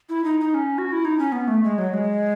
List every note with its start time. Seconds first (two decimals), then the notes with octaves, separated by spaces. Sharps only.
0.09 E4
0.24 D#4
0.40 D#4
0.54 C#4
0.78 F#4
0.92 E4
1.05 D#4
1.19 C#4
1.32 B3
1.48 A3
1.63 G#3
1.78 F#3
1.94 G#3